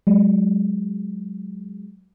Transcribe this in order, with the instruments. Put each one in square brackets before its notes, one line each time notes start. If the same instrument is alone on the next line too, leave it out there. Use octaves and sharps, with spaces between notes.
[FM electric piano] F#3 G#3